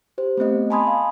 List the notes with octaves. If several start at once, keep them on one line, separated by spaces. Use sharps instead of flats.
G4 C5
A3 B3 C4 D#5
G#5 A5 B5 C6 D#6 G#6
F5